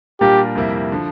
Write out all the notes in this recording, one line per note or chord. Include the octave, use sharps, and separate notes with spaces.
A#2 G3 D4 F4 G4 A#4
F2 C3 G3 A#3 E4
D3 F3